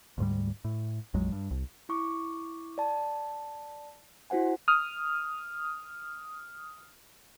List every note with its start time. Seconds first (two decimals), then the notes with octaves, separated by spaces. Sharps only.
0.18 D2 G#2 G3
0.65 A2
1.14 A#1 F2 F#3 G#3
1.32 G2
1.51 C2
1.89 E4 C#6 D6
2.78 D5 A5
4.30 E4 F#4 C5 F#5 G#5
4.68 D#6 F6